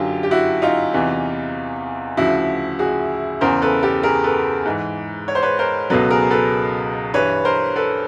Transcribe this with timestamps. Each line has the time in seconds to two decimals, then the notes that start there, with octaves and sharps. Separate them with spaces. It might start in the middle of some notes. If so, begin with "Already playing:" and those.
Already playing: F#2 D3 F#3 F4 G4
0.23 G4
0.31 E4 F#4
0.62 D#4 F4
0.93 E2 C3 E3
2.17 D2 C#3 F3 E4 F#4
2.79 F#4 G#4
3.41 E2 C#3 E3 A#4 C5
3.62 A4 B4
3.83 G4 A4
4.03 G#4 A#4
4.24 A4 B4
4.66 G#2 E3
5.28 C#5
5.35 C5
5.43 B4 C#5
5.59 A#4 C5
5.90 C#2 B2 F#3 A4 B4
6.11 G#4 A#4
6.31 A4 B4
7.14 G2 E3 B4 C#5
7.45 A#4 C5
7.76 A4 B4